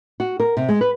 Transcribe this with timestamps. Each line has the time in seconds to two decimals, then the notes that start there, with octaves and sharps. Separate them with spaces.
0.20 F#4
0.40 A#4
0.57 C3
0.69 G#3
0.81 B4